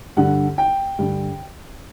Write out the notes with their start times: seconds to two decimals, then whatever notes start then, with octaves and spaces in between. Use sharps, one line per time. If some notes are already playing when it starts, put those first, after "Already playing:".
0.17 G2 D3 F#5
0.58 G5
0.99 G2 D3